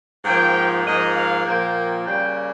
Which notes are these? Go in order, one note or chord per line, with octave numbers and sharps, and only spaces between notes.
G#2 F3 A#3 G5
G#2 F3 A#3 D#5
F5
A#2 F3 A#3 G5
C#3 G3 A#3 G5